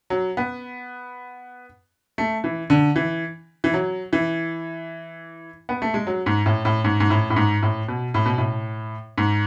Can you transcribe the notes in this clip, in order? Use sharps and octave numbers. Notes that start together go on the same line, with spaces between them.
F#3
B3
A3
E3
D3
E3
E3
F#3
E3
B3
A3
G#3
F#3
G#2
A2
A2
G#2
G#2
A2
A2
G#2
A2
B2
A2
B2
A2
G#2